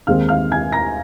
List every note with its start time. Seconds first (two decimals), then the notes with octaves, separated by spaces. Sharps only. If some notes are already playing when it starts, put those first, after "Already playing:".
0.07 D#2 D#3 G#3 C4 F5 F6
0.29 F5 F6
0.52 G#5 G#6
0.72 A#5 A#6